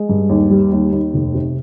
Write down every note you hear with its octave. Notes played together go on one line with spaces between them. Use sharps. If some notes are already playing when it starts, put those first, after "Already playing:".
Already playing: G#3
G2
D#2
G3
D#2
D#2
F1
C3